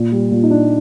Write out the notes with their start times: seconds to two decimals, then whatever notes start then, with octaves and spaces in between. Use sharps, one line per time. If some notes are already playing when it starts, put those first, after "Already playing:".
Already playing: A#2
0.12 G3
0.31 A#2
0.43 D#4
0.51 D4